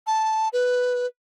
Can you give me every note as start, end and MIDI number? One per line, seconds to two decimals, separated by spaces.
0.07 0.49 81
0.53 1.07 71